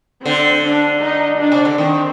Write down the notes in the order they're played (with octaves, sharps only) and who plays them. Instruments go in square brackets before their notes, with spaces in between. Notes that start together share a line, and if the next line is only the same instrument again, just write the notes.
[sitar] D3 [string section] C4
[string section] D4
D#4
D4
[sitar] C3
D3
[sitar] D#3 [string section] C4